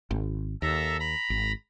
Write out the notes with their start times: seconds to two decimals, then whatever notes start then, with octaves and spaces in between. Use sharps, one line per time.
0.11 G#1
0.62 D#2 A4 E5 A#5
1.00 A#5 B5
1.30 G#1